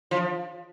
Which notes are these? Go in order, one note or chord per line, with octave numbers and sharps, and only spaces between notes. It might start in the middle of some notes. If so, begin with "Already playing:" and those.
F3